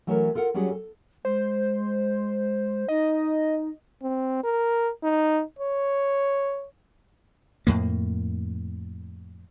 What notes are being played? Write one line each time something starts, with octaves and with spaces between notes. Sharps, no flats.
E3 F#3 A3 C#4 F#4 A#4
F4 A4 A#4 F#5
F#3 G3 C#4 F#4 G#4
A4
G#3 C5
D#4 D#5
C4
A#4
D#4
C#5
F2 A2 A#3